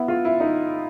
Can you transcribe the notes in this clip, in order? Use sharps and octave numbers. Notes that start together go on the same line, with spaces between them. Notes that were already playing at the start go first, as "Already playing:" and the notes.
Already playing: B3 E4
F4
E4
D#4